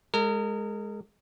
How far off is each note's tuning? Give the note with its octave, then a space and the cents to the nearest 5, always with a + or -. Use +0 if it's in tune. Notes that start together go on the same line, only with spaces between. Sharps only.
G#3 +0 A#4 -35